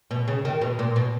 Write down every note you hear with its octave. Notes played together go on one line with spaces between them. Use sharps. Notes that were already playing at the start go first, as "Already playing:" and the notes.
B2
C#3
D#3
B2
A#2
B2